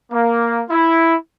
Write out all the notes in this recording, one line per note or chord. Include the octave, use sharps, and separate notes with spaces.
A#3
E4